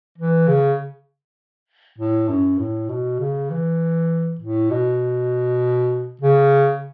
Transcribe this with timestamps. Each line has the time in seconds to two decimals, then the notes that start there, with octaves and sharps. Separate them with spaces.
0.18 E3
0.48 C#3
1.98 A2
2.29 F#2
2.58 A2
2.89 B2
3.20 C#3
3.50 E3
4.40 A2
4.70 B2
6.21 C#3